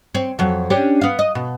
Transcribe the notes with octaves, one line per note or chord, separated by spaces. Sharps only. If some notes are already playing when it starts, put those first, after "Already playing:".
C4 C#5
F2 F#3
C#4 D4 G4
B3 F5
D#5
B2